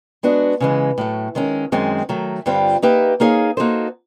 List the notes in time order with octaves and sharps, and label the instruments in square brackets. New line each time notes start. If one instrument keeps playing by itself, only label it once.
[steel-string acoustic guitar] G#3 B3 D4 F#4
C#3 E3 G#3
A2 F#3 A3
D#3 G#3 C#4
F#2 D#3 G#3 C4
D#3 F#3 A3
G2 D3 G3 C4 F4
A#3 D#4 G4 B4 E5
A#3 D#4 G#4 C#5 F5
A#3 D#4 F#4 A4 C5